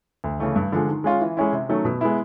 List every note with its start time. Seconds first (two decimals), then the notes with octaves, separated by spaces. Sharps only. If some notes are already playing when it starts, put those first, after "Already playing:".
0.24 D2
0.40 C#3 E3 A3
0.56 G2
0.72 D3 F3 G#3
0.88 D#3
1.04 G#3 C#4 F4
1.21 E3
1.37 G#3 C#4 E4
1.53 C3
1.69 D#3 F#3 A3 C#4
1.85 B2
2.01 G#3 B3 E4